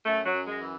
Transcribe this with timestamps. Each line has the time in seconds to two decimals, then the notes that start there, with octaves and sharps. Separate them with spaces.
0.05 F#2 A3
0.26 F#3
0.33 F#2
0.47 G#3
0.61 E3